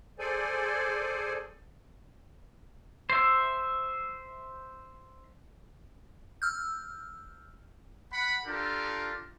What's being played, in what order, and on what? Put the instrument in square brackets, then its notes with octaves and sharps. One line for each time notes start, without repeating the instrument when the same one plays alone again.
[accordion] G#4 A4 C5 D5 G#5
[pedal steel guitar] C5 E5
[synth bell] E6 F6 G6
[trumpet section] F#5 B5
D4 F4 G4 A4 A#4